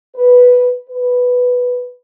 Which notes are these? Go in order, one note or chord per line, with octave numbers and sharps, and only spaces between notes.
B4
B4